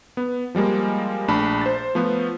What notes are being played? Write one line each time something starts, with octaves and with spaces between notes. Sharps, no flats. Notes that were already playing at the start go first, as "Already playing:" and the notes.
B3
F3 G3 G#3 A#3
A#1 A3 D4 A5 B5
C5 A6
F3 A3 B3